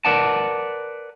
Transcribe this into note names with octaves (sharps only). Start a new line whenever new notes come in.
A#4 B4 D5 F#5 A5